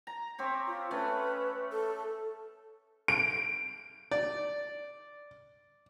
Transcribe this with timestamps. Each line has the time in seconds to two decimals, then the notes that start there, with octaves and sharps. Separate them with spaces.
0.07 A#5
0.38 C4 G4 C#5
0.67 F4
0.91 A3 C#4 B4
1.71 A4
3.08 D7
4.11 D5